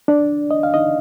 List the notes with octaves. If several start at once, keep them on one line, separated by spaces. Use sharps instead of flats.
D4 D5
D#5
F5
D#4 D#5